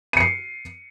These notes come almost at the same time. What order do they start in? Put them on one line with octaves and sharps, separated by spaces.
D#7 C#7 C7